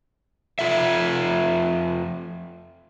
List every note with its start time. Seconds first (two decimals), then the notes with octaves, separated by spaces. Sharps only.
0.59 F2 F4 A4 E5